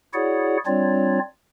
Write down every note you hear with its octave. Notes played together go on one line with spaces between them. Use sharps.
E4 F#4 G#4 C#5 D5 F#5
G3 C4 D4 F4 C#5 D5